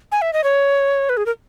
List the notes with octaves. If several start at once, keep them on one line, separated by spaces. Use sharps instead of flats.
G#5
E5
D#5
C#5
B4
G#4
A#4